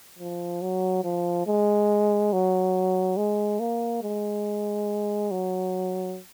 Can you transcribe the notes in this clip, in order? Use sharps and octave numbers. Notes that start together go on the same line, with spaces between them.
F3
F#3
F3
G#3
F#3
G#3
A#3
G#3
F#3